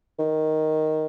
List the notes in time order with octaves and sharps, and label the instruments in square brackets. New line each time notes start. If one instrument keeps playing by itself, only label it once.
[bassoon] D#3